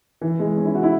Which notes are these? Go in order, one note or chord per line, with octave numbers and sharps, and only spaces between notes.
E3
G#3
C#4
E4
F#4
E4